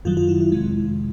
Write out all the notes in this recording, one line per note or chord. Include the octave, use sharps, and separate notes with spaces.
F#2 D#3 F#3 F4
F4
E4
E4
F2 C3 D#3 G#3